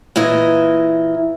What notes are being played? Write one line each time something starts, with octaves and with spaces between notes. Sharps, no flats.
A#2 E3 E4 D#5